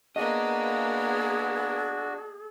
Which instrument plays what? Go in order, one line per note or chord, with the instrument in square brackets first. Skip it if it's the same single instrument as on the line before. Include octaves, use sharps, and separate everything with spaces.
[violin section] A#3 B3 [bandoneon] D4 F#4 [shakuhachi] G#4 [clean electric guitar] D#5